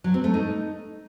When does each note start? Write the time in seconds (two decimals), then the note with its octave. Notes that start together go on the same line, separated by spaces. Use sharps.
0.04 F#3
0.14 C4
0.24 A3
0.34 D#4